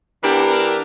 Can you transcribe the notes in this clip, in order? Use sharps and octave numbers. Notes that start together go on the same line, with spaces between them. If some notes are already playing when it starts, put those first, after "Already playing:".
E3 B3 D4 G4 A#4